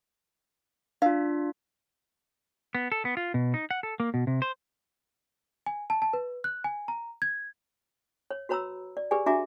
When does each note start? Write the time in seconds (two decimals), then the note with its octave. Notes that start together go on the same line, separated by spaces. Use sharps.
1.02 D4 F4 F5
2.75 B3
2.92 A4
3.05 B3
3.17 F4
3.34 B2
3.54 D#4
3.71 F#5
3.83 A4
4.00 A#3
4.14 B2
4.27 C3
4.42 C5
5.66 G#5
5.90 A5
6.02 A5
6.13 B4
6.44 F#6
6.64 G#5
6.88 A#5
7.22 G#6
8.31 C#5
8.49 F#4 B4 C#5 A#5 B5 E6
8.97 D5
9.11 G4 G#4 B4 D5 G#5
9.26 D4 F#4 E5 G#5 A#5 D6